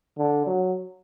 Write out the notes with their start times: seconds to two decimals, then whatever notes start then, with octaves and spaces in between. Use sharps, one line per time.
0.18 D3
0.46 F#3